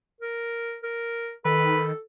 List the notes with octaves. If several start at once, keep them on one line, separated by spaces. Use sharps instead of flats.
A#4
A#4
D#3 A4 B4